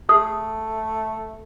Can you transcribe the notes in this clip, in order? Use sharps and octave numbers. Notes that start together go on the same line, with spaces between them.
A3 G#4